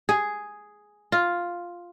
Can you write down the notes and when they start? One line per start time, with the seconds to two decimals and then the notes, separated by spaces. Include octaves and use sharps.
0.09 G#4
1.12 F4